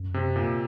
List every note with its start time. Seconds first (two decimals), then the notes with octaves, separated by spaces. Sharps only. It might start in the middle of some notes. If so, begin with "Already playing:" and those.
Already playing: F#2
0.14 C3
0.36 A#2